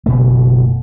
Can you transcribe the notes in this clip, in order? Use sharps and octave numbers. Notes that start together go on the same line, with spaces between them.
F#1 B2 A3